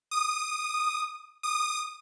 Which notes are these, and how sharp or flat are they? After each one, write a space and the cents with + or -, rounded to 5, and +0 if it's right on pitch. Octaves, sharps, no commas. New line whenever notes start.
D#6 -15
D#6 -20